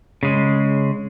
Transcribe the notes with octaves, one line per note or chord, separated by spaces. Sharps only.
C#3 G#3